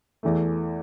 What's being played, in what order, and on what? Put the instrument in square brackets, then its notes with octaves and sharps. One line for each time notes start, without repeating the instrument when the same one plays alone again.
[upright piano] E2 E3 A3